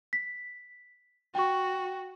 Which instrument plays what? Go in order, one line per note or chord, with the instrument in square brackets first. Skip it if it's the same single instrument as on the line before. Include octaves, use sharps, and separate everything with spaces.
[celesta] B6
[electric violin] F#4 [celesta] G5 C#6